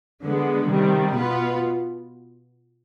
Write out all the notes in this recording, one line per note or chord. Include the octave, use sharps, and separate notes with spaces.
D3 G#3 B3
C3 D#3 G3
B2 B3 F4 B4